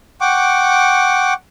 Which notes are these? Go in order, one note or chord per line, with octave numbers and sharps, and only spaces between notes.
F#5 G5 C#6 D6